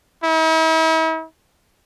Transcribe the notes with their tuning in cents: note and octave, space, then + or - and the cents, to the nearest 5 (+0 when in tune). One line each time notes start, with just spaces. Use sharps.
E4 -45